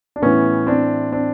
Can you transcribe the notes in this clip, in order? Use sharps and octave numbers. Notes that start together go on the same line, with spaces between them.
D4
A2 E3 B3 C#4
C4 D4
C4 D4